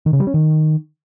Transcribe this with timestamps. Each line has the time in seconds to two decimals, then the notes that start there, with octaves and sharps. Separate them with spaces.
0.06 D#3
0.13 C#3
0.20 G3
0.27 C#4
0.34 D#3